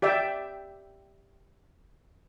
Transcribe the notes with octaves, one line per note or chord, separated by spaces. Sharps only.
G4 D5 E5 G5